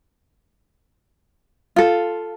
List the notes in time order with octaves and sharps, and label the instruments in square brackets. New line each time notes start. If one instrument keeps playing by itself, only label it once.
[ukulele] F4 A4